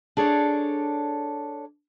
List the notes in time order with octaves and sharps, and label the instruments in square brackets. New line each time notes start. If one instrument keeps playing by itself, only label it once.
[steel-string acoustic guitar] D4 G#4 A4 C#5 D5